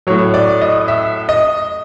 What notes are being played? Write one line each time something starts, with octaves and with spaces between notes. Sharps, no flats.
A2 F#3 C#5
D5
D#5
E5
D#5